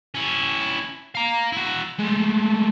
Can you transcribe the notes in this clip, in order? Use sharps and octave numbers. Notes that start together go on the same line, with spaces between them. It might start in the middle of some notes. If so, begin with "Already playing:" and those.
C#4 E4
F5 A#5
E4 F#4
G#3 A3